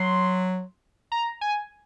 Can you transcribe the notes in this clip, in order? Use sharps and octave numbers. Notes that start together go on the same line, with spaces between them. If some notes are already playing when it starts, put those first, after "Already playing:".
Already playing: F#3 C6
A#5
G#5